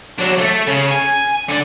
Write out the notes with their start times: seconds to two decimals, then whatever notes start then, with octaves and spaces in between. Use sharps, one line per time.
0.19 F#3 D4
0.38 A3 A4
0.67 C#3
0.91 G#5
1.49 D3 D5